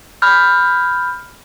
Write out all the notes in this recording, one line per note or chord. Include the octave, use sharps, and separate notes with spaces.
B5 F6 G6